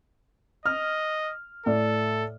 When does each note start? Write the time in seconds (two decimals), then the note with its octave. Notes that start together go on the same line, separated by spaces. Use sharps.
0.66 D#5 F6
1.66 A2 A4 D5